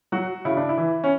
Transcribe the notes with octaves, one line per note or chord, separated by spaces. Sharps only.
F#3 F#4
C#3 E4
D4
E4
E3
C#4